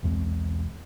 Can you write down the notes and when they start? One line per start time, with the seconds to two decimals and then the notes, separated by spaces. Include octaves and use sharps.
0.03 B1 E2 G#3 C4